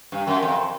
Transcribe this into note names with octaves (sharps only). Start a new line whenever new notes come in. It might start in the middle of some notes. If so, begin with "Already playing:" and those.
G2
F#2
F2